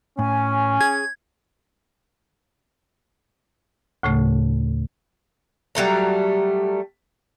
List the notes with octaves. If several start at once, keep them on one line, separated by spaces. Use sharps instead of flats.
A2 C#4 G#5
G#4 G#6
D2 A2 C#3 A3
F#3 G3 A3 A#5